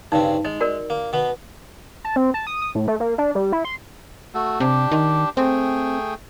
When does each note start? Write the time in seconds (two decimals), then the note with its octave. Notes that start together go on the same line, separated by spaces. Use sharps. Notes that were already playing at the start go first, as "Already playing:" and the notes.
0.12 G2 C#3 C4 D#4
0.45 G#3 D#5
0.60 F#4 A#4 D5
0.90 A#3
1.13 B2 B3
2.05 A5
2.16 C4
2.34 A5
2.47 D#6
2.62 D#6
2.75 A2
2.88 A3
3.00 A#3
3.18 D4
3.35 G3
3.52 E4
3.65 C6
4.34 A3 F#4 A4
4.60 C3 D4 G4
4.91 D#3
5.37 A3 C4 G#4 G5